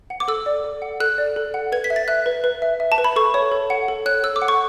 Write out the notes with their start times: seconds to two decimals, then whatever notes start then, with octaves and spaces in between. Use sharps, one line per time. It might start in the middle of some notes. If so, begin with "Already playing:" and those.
0.10 F#5
0.20 D6
0.28 A4 E6
0.46 D5
0.64 A4
0.82 F#5
1.00 A4 F#6
1.18 D5
1.36 A4
1.54 F#5
1.72 B4 G#6
1.84 B6
1.90 E5
1.96 A6
2.08 E5 F#6
2.26 B4
2.44 B4
2.62 E5
2.80 E5
2.92 A5
2.98 B4
3.04 B5
3.16 A4 C#6
3.34 C#5
3.52 A4
3.70 F#5
3.88 A4
4.06 C#5 F#6
4.24 A4 E6
4.36 D6
4.42 F#5
4.48 C#6